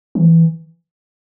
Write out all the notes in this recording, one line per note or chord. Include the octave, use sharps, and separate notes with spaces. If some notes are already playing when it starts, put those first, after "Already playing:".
E3